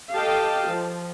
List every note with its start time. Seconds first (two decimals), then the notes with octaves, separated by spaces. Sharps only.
0.12 G4 A4 D#5 F5 G5 A5
0.68 F3